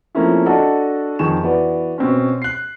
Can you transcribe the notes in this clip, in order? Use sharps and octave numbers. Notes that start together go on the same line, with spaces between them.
F3 A3 A#3 C4 C#4 E4
D4 F#4 A4 D#5 A5
F2 D#3 G#4 G#5 C#6 E7
E3 B3 F#4 D5
B2 C4 C#4
F#6 C7